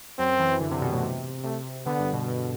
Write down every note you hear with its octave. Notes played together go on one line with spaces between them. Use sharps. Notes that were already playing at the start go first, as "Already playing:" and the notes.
F#2 C4
E3
D3
C3
B2
A2
C3
C3 A3
D3 B3
G2
B2
B2